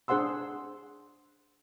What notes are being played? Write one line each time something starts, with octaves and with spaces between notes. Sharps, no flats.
D4 G#4 C5 F#5 C6 E6